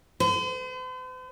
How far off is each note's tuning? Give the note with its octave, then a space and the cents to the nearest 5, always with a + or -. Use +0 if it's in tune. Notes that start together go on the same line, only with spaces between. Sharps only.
C5 -45